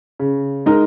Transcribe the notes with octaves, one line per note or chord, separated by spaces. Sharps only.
C#3
G#3 D#4 A#4 D#5